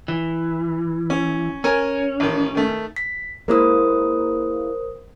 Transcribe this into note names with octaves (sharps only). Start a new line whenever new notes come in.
E3
C#4
C#4 A#4 G#5
A1 D#3
D#3 A3
B6
G#3 A#3 E4 A#4 C5 D#6